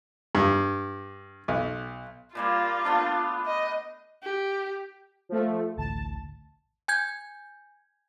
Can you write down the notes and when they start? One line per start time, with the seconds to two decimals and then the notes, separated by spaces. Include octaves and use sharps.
0.35 G2
1.48 B1
2.35 A#2 G3 A#3 F4
2.85 A3 B3 D4
3.45 D#5
4.23 G4
5.29 F3 A3
5.77 A1 D2 A2 A5
6.88 G#5 G6 G#6